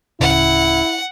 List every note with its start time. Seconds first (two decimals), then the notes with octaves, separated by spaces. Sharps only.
0.21 D1 C#3 E4 F#5